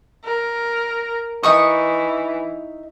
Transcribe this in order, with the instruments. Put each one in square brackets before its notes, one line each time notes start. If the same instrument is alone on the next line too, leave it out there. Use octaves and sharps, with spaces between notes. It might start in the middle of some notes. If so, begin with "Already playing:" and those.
[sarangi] A#4
[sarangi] E3 [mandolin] D#4 C#6 D#6